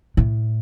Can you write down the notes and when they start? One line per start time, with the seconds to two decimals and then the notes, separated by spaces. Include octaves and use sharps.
0.17 A2